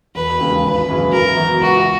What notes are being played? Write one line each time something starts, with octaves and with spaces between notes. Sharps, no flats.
E1 B4
D#2 C#3 G#3
G#1 B4
F#2 C#3 E3 G#3
F#2 A#4
E3 B3 F#4
C#2 F#4